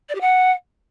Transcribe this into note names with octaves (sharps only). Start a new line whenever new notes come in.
D5
G4
F#5